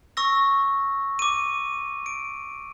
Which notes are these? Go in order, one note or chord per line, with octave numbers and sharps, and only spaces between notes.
C#6 E6 A#6
D6 D#7
D7